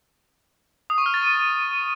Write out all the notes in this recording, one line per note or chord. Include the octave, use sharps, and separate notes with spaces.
D#6
C#6
F6
A6
D#7